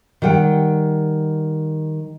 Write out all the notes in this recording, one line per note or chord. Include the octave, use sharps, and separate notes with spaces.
D#3 G3 F#5 G5